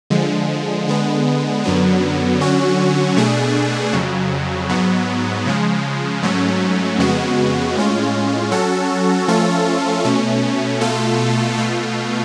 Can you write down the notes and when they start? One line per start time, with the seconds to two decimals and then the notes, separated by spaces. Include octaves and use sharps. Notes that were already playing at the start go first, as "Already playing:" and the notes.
0.10 D3 F3 G#3
0.88 D3 G#3 B3
1.64 F#2 D3 F#3 B3
2.40 D3 F#3 C#4 F#4
3.16 B2 A3 D4 G#4
3.93 F2 C#3 F#3
4.69 G#2 F#3 B3
5.46 C#3 F3 G#3
6.22 G#2 F#3 A3 C#4
6.98 F2 C#3 G#3 B3 F#4
7.75 A2 G#3 C#4 F4
8.52 F#3 C#4 F#4 A4
9.28 F3 A3 C#4 F4 A4
10.05 B2 A3 C#4
10.81 B2 A3 F4 A4
11.57 B2 A3 F4